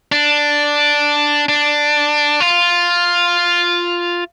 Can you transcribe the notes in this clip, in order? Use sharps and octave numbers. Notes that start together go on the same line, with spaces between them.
D4
D4
F4